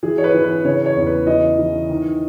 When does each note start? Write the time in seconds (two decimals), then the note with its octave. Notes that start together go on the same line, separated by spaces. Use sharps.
0.03 E3 G#4
0.18 C#5
0.24 B4
0.34 E3
0.44 B4
0.65 C#3 C#5
0.86 C#5
0.96 E2
1.07 B4
1.27 E3 D#5
1.59 E3
1.89 D#3